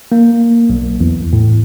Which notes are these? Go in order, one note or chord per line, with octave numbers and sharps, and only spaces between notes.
A#3
B1
E2
A2